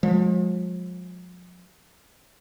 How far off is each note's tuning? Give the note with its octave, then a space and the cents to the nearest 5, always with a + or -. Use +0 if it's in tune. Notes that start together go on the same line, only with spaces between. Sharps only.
F3 +45 G#3 +0